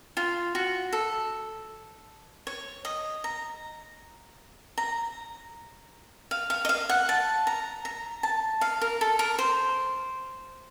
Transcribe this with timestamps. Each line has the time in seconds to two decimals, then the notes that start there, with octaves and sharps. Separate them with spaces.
0.17 F4
0.55 F#4
0.93 A4
2.47 C#5
2.85 D#5
3.24 A#5
4.78 A#5
6.31 F5
6.50 F5
6.65 D#5
6.69 F5
6.89 F#5
7.09 A5
7.47 A#5
7.85 A#5
8.23 A5
8.61 F5
8.81 A#4
9.01 A4
9.19 A#4
9.39 C5